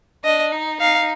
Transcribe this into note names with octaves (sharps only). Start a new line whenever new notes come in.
D4 D#5
D#4
D#4 F5